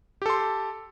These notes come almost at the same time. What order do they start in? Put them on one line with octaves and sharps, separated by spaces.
G4 A4 C6